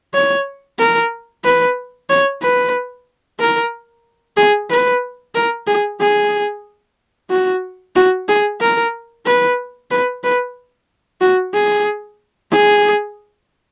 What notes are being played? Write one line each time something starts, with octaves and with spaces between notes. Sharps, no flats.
C#5
A#4
B4
C#5
B4
A#4
G#4
B4
A#4
G#4
G#4
F#4
F#4
G#4
A#4
B4
B4
B4
F#4
G#4
G#4